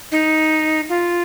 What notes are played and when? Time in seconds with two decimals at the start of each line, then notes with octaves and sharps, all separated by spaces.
0.12 D#4
0.89 F4